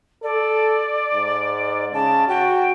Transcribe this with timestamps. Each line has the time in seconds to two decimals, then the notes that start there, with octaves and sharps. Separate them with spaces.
0.23 A4 D5
1.14 G#2
1.93 C#3 A5
2.28 F#4 G5